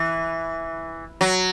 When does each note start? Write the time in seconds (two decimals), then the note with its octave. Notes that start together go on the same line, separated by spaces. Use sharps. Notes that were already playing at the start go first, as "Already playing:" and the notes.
Already playing: E3
1.21 F#3